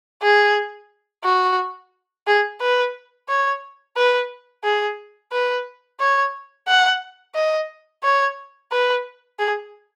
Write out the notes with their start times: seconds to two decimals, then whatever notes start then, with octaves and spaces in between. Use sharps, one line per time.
0.22 G#4
1.24 F#4
2.27 G#4
2.61 B4
3.28 C#5
3.96 B4
4.64 G#4
5.32 B4
6.00 C#5
6.68 F#5
7.35 D#5
8.03 C#5
8.72 B4
9.39 G#4